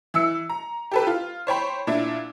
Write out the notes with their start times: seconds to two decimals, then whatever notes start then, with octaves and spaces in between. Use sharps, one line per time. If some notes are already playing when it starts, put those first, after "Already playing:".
0.14 E3 E6 C#7
0.50 A#5
0.92 G4 A4 B4
1.07 F4
1.47 C5 C#5 G5 B5
1.87 A#2 D4 E4